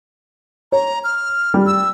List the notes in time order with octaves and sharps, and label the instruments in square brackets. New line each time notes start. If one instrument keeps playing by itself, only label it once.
[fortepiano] C#5 [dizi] A#5
[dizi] F6
[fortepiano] G3
[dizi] E6